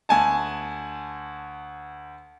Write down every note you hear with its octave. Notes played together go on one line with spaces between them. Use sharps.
D2 G#5 A5